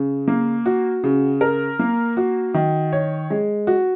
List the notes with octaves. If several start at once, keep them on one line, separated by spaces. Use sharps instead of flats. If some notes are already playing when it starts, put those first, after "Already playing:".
Already playing: C#3
A#3
F#4
C#3
A#4
A#3
F#4
D#3
C#5
G#3
F#4